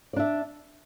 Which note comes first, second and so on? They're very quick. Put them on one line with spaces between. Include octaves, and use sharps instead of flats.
D5 D4 E5